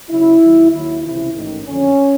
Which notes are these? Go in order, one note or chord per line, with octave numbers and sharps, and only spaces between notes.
C#2 C#3 F#3 E4
D#2 D#3 F#3
D#2 D#3 F#3 E4
C#2 C3 E3 E4
A1 G#2 D#3
F#1 F2 D3 F3 C#4